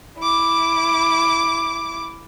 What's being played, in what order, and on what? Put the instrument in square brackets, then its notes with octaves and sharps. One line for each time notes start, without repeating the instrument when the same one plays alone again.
[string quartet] E4 D6